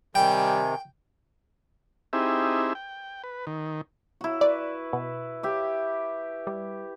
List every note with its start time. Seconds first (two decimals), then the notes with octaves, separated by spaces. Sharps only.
0.15 C3 D#3 G3 G5 G#5
2.13 C4 D#4 E4 G4 G#4 E5
2.75 G5
3.24 B4
3.47 D#3
4.21 E4 F#4
4.41 B4 D5
4.93 B2
5.43 G4 E5
6.47 G3